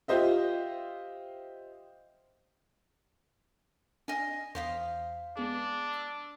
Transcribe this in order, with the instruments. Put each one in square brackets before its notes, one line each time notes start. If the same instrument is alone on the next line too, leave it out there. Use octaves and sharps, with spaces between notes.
[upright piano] F4 G4 C5 D#5 E5
[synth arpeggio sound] D4 [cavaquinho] D#5 G#5
[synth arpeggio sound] E2 B6 [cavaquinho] C5 F5 D#6
[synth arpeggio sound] G#3 B3 G#4 [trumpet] D4
[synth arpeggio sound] E6